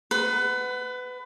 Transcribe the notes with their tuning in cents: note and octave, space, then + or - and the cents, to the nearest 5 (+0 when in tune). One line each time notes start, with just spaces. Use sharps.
B4 +25 F#5 +0